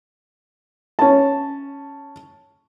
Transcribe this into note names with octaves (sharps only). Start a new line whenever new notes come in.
C#4 A5